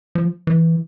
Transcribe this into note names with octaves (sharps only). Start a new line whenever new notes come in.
F3
E3